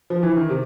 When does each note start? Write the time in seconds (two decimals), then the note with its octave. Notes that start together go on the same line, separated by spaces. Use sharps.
0.10 F3
0.23 E3
0.37 D#3
0.50 C3